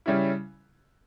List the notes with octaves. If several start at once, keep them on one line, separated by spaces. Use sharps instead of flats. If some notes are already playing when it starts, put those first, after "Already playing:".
C#3 G3 C#4 E4